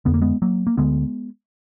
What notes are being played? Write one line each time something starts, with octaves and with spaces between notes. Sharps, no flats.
F2 D3 B3
A#3
G#3 B3
F#3 A#3
A#3
D2 D3 G#3 B3